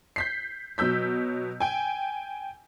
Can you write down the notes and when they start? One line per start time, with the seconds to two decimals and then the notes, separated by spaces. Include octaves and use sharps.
0.16 G6 B6 C7
0.78 B2 F#3 E6 G6 B6
1.60 G5 G#5